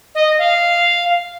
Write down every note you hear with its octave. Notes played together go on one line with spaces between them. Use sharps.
D#5
F5